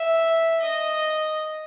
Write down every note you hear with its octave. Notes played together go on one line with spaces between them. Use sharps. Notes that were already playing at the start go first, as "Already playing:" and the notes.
Already playing: E5
D#5